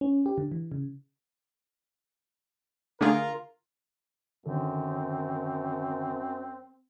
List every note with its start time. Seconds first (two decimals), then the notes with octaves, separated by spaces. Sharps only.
0.01 C#4
0.26 G4
0.38 D3
0.52 E3
0.72 C#3
3.01 D3 A3 F4 G#4 A#4
4.46 F#2 D3 D#3 C4 A4